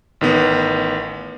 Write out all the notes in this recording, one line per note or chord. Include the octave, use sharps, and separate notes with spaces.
A1 D#3 B3